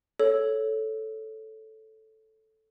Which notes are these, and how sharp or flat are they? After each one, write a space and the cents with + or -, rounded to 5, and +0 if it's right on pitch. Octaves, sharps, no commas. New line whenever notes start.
A4 -5 C#5 +0